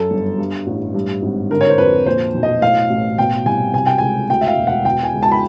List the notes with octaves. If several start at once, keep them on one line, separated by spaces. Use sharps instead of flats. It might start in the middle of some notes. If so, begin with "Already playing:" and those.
Already playing: F#2 A4
G1
G2
A1
G2
G#1
D3 A#4
C#5
C5
F2 B4
A#2 C5
B1
D#5
A2 F5
A1
B2 G5
C2 G#5
C3 G#5
G5
C#2 G#5
D2 G5
E5
F5
E1
F#5
B2 G5
G#5
C#2
A5
B5